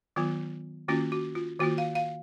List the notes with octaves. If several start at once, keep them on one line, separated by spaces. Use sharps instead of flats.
D#3 F#3 B3 F4
D#3 A#3 C#4 F4 F#4
F#4
F4
D#3 A#3 F4 F#4
F5
F5